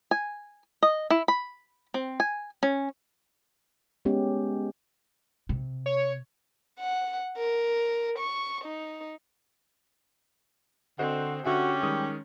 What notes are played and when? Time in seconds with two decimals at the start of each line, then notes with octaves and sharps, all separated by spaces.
0.11 G#5
0.83 D#5
1.10 E4
1.28 B5
1.94 C4
2.20 G#5
2.63 C#4
4.05 G#3 B3 C#4 G4
5.49 C3
5.86 C#5
6.80 F#5
7.38 A#4
8.18 C#6
8.64 D#4
10.99 D3 C4 F#4 C5 D#5 F#5
11.46 D3 C#4 F#4 G4 E5
11.83 D#3 G3 G#3 D#6